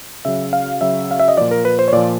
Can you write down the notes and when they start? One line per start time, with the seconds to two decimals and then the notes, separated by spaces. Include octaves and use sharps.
0.25 C#3 F#3 E5
0.53 F5
0.81 C#3 F#3 E5
1.11 F5
1.19 E5
1.28 D#5
1.37 A#2 F3 D5
1.51 A#4
1.65 B4
1.79 C5
1.88 C#5
1.92 A#2 F3 D5